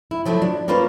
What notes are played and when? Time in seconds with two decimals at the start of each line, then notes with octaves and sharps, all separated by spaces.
0.11 E4
0.25 F3 F#3 A3 E4
0.42 D4
0.68 A#3 C#4 F4 B4 C5